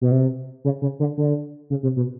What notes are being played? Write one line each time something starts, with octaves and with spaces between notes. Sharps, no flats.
B2
C3
C#3
C#3
D3
D3
C#3
C3
B2